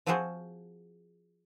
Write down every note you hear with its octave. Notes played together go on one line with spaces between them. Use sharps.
F3 C4 F4 F#4 G#4 C5